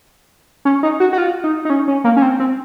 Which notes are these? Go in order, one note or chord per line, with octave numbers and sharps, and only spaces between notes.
C#4
D#4
F#4
F#4
F4
D#4
D#4
C#4
C#4
A#3
C#4
C4
C4